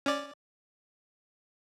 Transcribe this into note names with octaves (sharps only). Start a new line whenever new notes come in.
C#4 D5